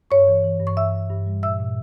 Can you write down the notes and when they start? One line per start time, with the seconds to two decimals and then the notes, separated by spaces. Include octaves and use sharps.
0.11 G2 C#5 C#6
0.28 E3
0.44 E3
0.60 G2
0.67 C#6
0.77 G2 E5 E6
0.93 G2
1.10 G2
1.26 G3
1.43 A#2 E5 E6
1.60 A#2